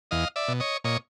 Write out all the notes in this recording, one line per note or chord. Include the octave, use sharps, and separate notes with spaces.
E2 D#5 F5
D5 E5
B2
C#5 D#5
A#2 C#5 D#5